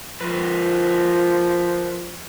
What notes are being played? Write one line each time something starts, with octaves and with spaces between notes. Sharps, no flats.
F3 F4 A#4 B4